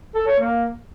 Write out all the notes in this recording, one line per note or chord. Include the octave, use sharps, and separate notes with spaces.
A4
C#5
A#3